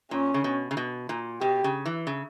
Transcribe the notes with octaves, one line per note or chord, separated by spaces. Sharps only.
A#2 C#4
C#3
B2
C#3
B2
A#2
B2 G4
C#3
E3
C#3